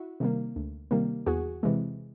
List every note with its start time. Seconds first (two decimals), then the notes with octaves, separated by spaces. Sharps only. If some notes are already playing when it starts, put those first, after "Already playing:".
Already playing: E4 F#4
0.20 C3 D#3 G3 A#3
0.56 D2
0.91 C3 D#3 G3 A#3
1.27 E2 F#4 G#4
1.63 C3 E3 G#3